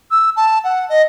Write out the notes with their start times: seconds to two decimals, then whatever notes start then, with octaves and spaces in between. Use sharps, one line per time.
0.11 E6
0.36 A5
0.64 F#5
0.89 D#5